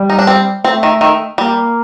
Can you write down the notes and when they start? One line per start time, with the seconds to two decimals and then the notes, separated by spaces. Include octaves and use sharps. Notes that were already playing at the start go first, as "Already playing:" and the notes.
Already playing: G3
0.10 D#4
0.19 D4
0.27 C4
0.64 A3 C4
0.83 D#3
1.01 D#3
1.38 G3 A#3